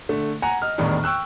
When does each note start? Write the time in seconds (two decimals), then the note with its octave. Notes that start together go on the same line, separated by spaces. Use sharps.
0.09 D3 A3
0.42 F#5 G#5 A#5
0.62 D#5 F6
0.78 E2 A2 D#3 G3 D4 D#4
1.04 G5 C#6 E6 F#6